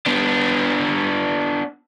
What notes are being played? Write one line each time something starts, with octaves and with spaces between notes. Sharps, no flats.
B3 D4